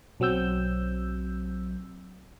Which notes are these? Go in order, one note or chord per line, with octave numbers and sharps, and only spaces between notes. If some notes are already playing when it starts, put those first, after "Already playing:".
B1 F#3 C4 E6 G6